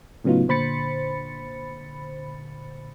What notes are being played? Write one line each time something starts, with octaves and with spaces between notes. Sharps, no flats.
A2 C#3 F#3 B3 D#4 F4
A#2 D3 C5 B5 A6 C#7